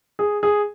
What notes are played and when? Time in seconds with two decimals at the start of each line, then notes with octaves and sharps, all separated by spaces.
0.19 G#4
0.43 G#4